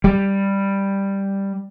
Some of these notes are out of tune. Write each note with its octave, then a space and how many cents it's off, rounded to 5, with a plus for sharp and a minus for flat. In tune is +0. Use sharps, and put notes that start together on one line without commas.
G3 +5